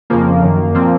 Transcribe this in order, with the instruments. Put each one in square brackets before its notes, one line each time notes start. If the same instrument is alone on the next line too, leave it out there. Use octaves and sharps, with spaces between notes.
[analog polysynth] F2 C#3 F3 A#3
F#2 D#3
A#2 F3 A#3 C4